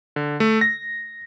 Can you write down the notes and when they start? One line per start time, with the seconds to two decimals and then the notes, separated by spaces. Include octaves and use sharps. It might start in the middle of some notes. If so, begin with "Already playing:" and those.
0.16 D3
0.40 A3
0.61 A#6